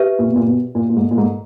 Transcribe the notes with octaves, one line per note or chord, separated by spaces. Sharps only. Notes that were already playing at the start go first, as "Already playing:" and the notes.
Already playing: G4 B4 E5
A#2
B2
A#2
B2
A#2
A#2
G#2
A#2
G#2